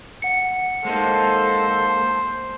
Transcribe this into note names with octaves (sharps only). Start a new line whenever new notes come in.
F#5 C#7
G#3 A#3 D#4 A4 C5